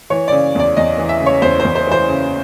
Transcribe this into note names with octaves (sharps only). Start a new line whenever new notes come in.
E3 C#5
C#3 D5
E2 D5
E2 D#5
E3
E5
C#3
C#5
E2 C5
E2 C5
C5
E3 C5
C#3